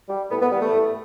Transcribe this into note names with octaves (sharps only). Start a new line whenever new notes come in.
G3
A2 B3
B3
E3 G3 B3
A3
A2